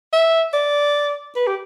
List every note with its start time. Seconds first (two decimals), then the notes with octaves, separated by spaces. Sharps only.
0.13 E5
0.54 D5
1.36 B4
1.47 G4